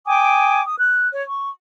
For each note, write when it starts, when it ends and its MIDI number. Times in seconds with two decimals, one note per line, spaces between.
0.06 0.61 79
0.06 0.61 80
0.06 0.61 86
0.06 0.61 87
0.65 0.78 87
0.79 1.09 90
1.12 1.22 73
1.28 1.49 85